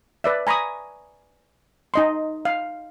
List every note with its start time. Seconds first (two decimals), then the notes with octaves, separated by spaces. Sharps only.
0.24 B4 D5 E5
0.47 G#5 A#5 B5 C#6 D#6
1.94 D#4 D#5 C6
2.45 F5